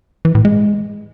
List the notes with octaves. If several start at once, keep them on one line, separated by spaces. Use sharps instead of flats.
E3
A2
G#3